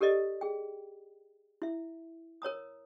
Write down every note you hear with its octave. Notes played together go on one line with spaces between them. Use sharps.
G4 A4 A#4 D5 D#5
G#4 G5
E4 E5
A#4 C#5 A#5 D#6